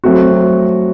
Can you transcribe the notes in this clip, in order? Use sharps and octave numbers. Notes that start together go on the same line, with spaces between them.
F#3 A3 C4 F#4